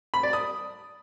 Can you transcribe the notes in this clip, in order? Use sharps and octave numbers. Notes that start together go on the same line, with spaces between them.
B5
D5
D#6